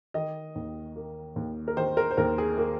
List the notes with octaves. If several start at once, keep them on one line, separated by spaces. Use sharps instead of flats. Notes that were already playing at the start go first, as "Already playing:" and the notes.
D#3 D#5
D#2
A#3
D#2
A#4
D#3 C5
A#4
C5
D#2 A#4
G#4
A#3